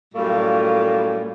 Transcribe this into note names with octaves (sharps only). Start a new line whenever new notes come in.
F#2 A2 G3 A3 A#3 F4